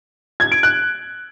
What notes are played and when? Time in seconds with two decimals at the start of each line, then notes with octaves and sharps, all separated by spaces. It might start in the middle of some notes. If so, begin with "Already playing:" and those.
0.40 G#6
0.52 D7
0.63 F#6